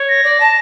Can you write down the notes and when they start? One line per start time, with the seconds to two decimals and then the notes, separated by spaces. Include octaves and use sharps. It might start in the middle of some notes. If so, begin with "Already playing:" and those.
Already playing: C#5
0.09 A#6
0.24 D5
0.40 A5